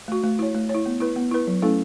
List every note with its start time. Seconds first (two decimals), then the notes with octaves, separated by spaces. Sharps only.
0.08 A3 F#4
0.24 A3
0.39 E4 C#5
0.54 A3
0.69 C#5
0.74 E4
0.86 B3
1.00 E4 B4
1.16 B3
1.31 E4 B4
1.47 F#3
1.62 A3 C#4 E4 A4